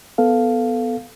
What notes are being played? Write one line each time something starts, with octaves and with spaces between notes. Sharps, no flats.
B3 A4 F5